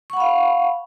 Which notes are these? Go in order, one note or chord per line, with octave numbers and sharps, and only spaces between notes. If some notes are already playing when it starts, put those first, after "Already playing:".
F5 F#5 B5 C#6